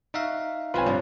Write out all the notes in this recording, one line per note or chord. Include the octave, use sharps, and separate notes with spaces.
D#4 F#4 E5 F5
C3 F#3 F4 B4 G#5
G2 A#2 F3